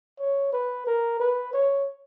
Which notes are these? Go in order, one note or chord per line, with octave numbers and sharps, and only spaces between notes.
C#5
B4
A#4
B4
C#5